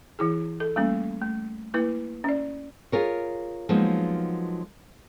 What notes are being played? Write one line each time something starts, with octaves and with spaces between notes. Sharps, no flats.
E3 E4 G#4
A4
G3 A3 A#3 C#4
A3
A#3 E4 B4
C#4 D5
F4 G#4 A#4 C#5
F3 F#3 G#3 A#3 B3 D#4